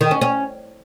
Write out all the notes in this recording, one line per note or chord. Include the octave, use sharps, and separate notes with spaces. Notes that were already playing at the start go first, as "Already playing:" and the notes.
D#3
C#4
C#4